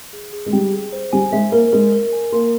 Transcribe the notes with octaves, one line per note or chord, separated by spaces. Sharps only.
G#4
G#4
G#3
G3 G5
G#4
C5
G3 G#5
G#3 E5
A#3 A#4
G#3 A#4
A#4
G#5
A#3 C6